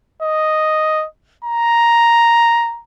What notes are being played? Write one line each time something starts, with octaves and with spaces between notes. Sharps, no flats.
D#5
A#5